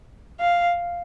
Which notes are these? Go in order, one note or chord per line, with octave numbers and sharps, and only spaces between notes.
F5